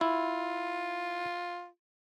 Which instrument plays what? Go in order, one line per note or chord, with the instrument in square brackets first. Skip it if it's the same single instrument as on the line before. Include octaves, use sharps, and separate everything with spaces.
[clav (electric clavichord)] E4 [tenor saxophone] F4